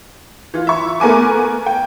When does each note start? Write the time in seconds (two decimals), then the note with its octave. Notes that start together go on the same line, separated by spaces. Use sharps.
0.54 E3 F4
0.67 E5 C#6
1.00 A3 B3 A#4 G#5 D6
1.66 G5